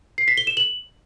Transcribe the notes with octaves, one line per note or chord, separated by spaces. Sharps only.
C7
B6
G7
E7
F#7